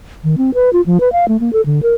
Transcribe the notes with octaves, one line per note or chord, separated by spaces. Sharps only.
D#3
C4
B4
F4
F3
B4
F5
A3
A#3
A4
D3
A#4